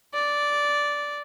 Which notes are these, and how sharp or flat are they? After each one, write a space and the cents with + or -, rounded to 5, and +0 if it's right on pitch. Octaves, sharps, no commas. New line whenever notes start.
D5 -10